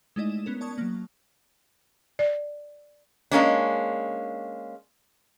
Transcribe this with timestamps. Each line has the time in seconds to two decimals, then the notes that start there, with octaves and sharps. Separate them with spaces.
0.16 G#3 A3 D#4 E4 D5 D#5
0.29 E7
0.46 B3 C#4 A#4
0.61 D5 A5 C#6 D#6 G#6
0.78 F#3 A#3
2.19 D5
3.31 G#3 A#3 C#4 D4